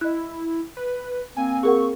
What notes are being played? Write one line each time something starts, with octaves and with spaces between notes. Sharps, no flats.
E4 D#5 F#6
B4
A#3 C4 G#5
G#4 A#4 F#5 C#6